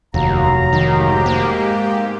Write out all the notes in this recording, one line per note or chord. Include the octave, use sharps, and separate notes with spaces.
F1 D#2 F#3 F5 A#5
G#2 D#3 G4
A#3